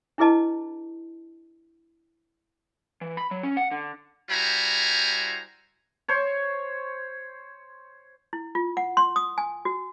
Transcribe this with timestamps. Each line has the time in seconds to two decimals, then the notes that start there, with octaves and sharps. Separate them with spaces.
0.18 D4 E4 G#4 B4 D#5 A5
3.01 E3
3.17 B5
3.31 F#3
3.43 C#4
3.57 F#5
3.71 D3
4.30 G3 E4 F#4 C5 G#5 A#5
6.08 C5 C#5
8.33 E4
8.55 F4
8.77 F#5
8.97 C6
9.16 D#6
9.38 G#5
9.65 F#4